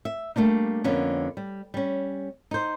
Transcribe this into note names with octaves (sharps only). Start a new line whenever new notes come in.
E5
G3 A3 A#3 D4 D#4
F2 D3 A#3 B3 C#4
G3
G3 C#4
D#4 C5